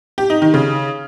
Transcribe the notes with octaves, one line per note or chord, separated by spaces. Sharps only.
G4
D#4
D#3
C#3